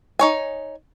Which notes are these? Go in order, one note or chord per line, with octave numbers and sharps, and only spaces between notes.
D#4 C#5 G#5